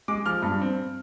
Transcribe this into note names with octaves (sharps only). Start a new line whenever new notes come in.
G#3 D6
F3 F6
G2
C4